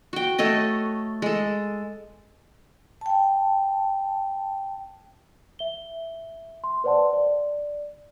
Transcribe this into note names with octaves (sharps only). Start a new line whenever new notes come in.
F#4 G5
A3 A4 C#5 D#5
G#3 A4
G5 A5
E5 G7
C6
B4 C5 D5 F#5 A5 C6
D5